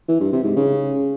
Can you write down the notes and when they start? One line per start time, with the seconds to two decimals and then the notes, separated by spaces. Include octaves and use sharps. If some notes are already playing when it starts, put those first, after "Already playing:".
0.09 E3
0.20 G2
0.32 C3
0.44 G#2
0.56 C#3